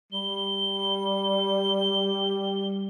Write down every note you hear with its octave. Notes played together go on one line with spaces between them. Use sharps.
G3 G7